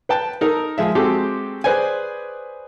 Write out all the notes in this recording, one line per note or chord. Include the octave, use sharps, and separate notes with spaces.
B4 G5 A5
D#4 A4 A#4
F3 G#3 E5
G#3 C4 F#4 G4 A4
G#4 B4 C5 D5 G#5